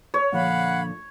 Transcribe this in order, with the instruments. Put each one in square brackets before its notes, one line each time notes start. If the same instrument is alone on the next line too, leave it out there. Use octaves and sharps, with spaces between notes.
[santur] C#5
[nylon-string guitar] A#2 D3 F3 [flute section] F5 F#5 B5